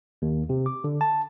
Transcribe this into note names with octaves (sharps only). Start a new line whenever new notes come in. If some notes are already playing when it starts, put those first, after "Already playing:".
D#2
C3
D6
D3
A5